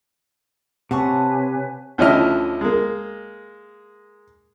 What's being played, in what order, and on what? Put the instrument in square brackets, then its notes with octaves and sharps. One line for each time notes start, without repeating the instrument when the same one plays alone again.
[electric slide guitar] C3 [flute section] B4 C#5 G#5 [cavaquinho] F#5 A5 C#6
[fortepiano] D2 F3 C#4 E4 D#5 F6
G#3 A#3